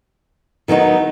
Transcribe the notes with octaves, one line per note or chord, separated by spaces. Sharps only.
D#3 F#3 B3 D#4